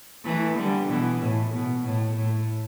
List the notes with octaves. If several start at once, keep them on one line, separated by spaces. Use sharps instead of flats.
E3 A3
D3 G3
B2 E3
A2
B2
A2
A2